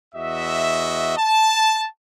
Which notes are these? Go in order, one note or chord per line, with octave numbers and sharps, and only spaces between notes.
E2 F#4 D#5 E5
A5